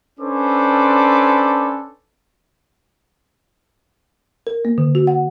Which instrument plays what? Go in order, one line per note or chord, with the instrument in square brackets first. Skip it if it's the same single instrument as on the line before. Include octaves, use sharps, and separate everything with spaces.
[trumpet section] C#4 D4 A4 B4 C5 D6
[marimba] A#4
A#3
D3
F#4
F#5